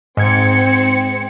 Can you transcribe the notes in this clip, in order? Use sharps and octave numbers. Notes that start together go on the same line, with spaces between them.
G#2 C4 G#6 C#7